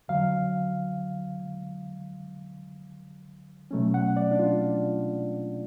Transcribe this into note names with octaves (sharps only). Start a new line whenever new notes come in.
F2 D3 F#3 F5
B2 F#3 A3 C#4
F#5
D5
D4
F4